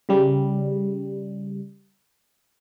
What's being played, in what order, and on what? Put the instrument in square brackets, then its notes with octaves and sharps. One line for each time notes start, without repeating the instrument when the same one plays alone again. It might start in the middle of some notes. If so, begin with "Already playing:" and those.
[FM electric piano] C#3 G3